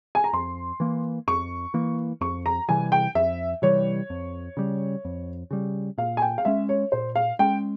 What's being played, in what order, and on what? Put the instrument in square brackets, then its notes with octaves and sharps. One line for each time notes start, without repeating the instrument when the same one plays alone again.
[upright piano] G#5
A#5
[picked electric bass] F2 [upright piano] C6
[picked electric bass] E3 A#3
[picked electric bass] F2 [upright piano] C#6
[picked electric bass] E3 A#3
[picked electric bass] F2 [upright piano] C#6
[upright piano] A#5
[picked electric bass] C3 E3 G3 [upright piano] G#5
[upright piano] G5
[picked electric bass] F2 [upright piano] E5
[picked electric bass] C3 E3 G3 [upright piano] C#5
[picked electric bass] F2
C#3 G3
F2
C#3 G3
[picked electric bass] A#2 [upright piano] F5
[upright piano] G#5
G5
F5
[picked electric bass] G#3 C#4 [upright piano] E5
[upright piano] C#5
[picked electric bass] A#2 [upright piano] C5
[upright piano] F5
[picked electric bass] G#3 C#4 [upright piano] G5